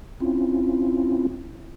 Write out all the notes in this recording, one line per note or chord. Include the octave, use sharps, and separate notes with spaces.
C4 C#4 E4 F4